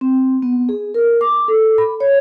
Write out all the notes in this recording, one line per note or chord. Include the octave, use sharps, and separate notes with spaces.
C4
B3
G#4
A#4
D6
A4
B5
C#5